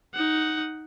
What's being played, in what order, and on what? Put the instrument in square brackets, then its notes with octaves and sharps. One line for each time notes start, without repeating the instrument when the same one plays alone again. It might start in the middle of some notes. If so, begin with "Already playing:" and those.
[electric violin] D#4 F#5